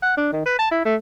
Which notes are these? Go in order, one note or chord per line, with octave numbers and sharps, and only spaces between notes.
F#5
D4
D#3
B4
A5
E4
A3